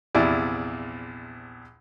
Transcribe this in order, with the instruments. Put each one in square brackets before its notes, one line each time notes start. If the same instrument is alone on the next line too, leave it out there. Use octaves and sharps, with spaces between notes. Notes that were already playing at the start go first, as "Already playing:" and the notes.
[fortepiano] A#1 E2 C3 E4 D5